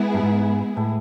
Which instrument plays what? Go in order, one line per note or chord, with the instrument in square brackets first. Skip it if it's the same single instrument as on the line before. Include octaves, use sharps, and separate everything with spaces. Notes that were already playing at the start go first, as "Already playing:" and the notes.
Already playing: [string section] G#3 B3 E4 G#4
[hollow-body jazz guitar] G2
G#2
A2